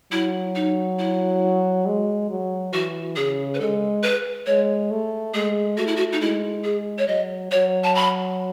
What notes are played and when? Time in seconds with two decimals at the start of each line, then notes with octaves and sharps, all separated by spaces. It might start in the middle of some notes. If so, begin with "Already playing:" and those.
0.12 F#3 E4
0.55 D#4
0.99 E4
1.86 G#3
2.30 F#3
2.72 E3 F#4
3.16 C#3 G#4
3.54 B4
3.60 G#3 A4
4.03 B4
4.46 G#3 C#5
4.91 A3
5.34 G#3 G#4
5.77 A3 F#4
5.87 E4
5.96 F#4
6.13 D#4
6.21 G#3 E4
6.64 G#4
6.98 C#5
7.08 F#3 D#5
7.51 F#3 C#5
7.84 A5
7.95 B5